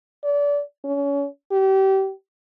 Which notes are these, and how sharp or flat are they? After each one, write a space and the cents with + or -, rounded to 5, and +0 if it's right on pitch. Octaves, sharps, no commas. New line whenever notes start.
D5 -30
C#4 +30
G4 -30